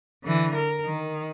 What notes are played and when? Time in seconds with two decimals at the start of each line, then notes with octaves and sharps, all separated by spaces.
0.24 D3 E3
0.55 A#4
0.85 D#3